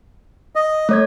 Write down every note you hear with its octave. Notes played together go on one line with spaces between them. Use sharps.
D#5
A3 C#5 G#6